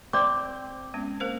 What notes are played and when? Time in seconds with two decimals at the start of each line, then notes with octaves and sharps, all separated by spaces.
0.13 C4 D5 D6
0.94 G#3 B3 C#4
1.20 A#3 A#4 C5